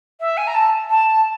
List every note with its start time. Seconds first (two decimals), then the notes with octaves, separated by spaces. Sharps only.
0.20 E5
0.37 G#5
0.47 A#5
0.54 A5
0.89 A5